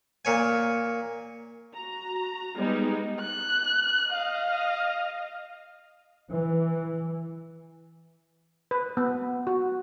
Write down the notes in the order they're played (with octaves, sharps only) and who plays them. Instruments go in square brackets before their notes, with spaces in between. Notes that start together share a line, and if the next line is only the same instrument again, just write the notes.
[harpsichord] A#2 C#5 G#5
[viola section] F#4 A#5
G3 G#3 B3 D#4
[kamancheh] F#6
D#5 F5
[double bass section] E3
[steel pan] B4
B3
F#4